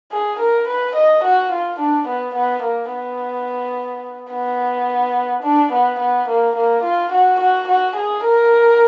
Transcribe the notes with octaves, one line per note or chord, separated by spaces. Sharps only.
G#4
A#4
B4
D#5
F#4
F4
D4
B3
B3
A#3
B3
B3
D4
B3
B3
A#3
A#3
F4
F#4
F#4
F#4
G#4
A#4